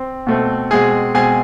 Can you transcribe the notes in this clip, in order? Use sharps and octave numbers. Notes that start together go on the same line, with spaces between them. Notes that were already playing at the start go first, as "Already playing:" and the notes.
Already playing: C4
B2 A3 C4
B2 G#3 C4 G#4 G#5
B2 G#3 C4 G#4 G#5